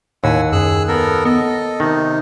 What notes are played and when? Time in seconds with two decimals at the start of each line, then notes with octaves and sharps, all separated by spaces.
0.24 D#2 A2 F#5 G#5 E6
0.52 F#2 G#4 E6 F#6
0.88 B3 A4 A#4
1.25 B3 A4 D#5
1.80 C3 D#3 D#4